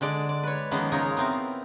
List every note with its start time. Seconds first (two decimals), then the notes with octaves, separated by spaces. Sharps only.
0.01 D3 G#3 D5
0.29 D5
0.43 B4 C#5
0.71 D#3 F3 G#3 A#3 B3 C#4
0.92 C#3 D#4 F4 A#4 C#5
1.17 B3 C4 E4 A#4